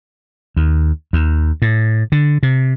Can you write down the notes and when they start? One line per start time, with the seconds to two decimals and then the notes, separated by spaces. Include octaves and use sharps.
0.57 D#2
1.13 D#2
1.62 A2
2.12 D3
2.43 C3